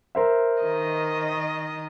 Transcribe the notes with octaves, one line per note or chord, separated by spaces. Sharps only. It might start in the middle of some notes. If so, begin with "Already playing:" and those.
A#4 C5 E5
D#3 D#5